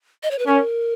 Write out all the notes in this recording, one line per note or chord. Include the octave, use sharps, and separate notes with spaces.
D#5
C#5
B4
C#4 A#4